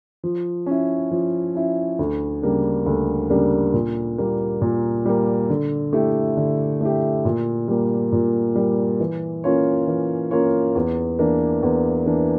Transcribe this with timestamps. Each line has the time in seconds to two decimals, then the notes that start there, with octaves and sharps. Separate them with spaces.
0.24 F3
0.66 C#4 E4
1.11 F3
1.55 C#4 E4
1.99 D2
2.42 C#3 G3 A#3 D4
2.86 D2
3.30 C#3 G3 A#3 D4
3.74 A#2
4.18 G3 A#3
4.62 A#2
5.05 G3 A#3
5.50 D3
5.93 A3 E4 G4
6.37 D3
6.81 A3 E4 G4
7.25 A#2
7.68 G3 A#3
8.12 A#2
8.55 G3 A#3
9.00 E3
9.44 A#3 C#4 F4 C#5
9.87 E3
10.31 A#3 C#4 F4 C#5
10.75 E2
11.19 E3 A#3 D4
11.63 E2
12.06 E3 A#3 D4